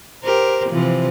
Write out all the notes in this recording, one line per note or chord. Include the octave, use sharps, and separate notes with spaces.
G4 A#4 C5
C3 E3 F3